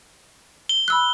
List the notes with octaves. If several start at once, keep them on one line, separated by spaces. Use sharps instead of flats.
G7
B5 E6 F#6